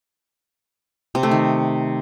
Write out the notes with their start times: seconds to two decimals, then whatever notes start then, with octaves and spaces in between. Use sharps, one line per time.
1.15 C3
1.23 A3
1.31 D#3